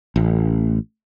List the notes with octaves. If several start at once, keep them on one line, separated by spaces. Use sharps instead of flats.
A1